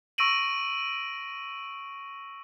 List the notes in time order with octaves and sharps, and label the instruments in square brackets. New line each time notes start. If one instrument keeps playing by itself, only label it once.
[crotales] C#6 E6 A#6 D7 D#7 F#7